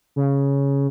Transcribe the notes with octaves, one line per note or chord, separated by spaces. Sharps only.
C#3